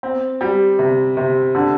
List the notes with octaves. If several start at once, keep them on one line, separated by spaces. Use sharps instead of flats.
C4
G3
C3
C3
D3